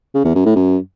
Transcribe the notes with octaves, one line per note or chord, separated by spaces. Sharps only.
C#3
E2
F#2
A2
F#2